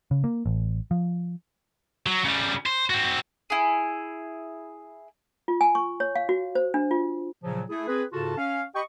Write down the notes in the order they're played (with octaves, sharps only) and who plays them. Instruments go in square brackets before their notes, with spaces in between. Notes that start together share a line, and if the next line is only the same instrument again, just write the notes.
[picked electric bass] C#3
A#3
A1
F3
[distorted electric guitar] F#3
C#3 G3
C5
C4 F#4
[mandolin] E4 G#4
[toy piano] F4
G#5
C#6
C#5
F5
F#4
C5
D4
F4
[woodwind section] A#2 C#3 F3 F#3
A3 E4 G#4
C4 G#4 B4
G#2 C#3 F4 F#4 A4 A5
C#4 F5
G4 D#5 G5 B5 C#6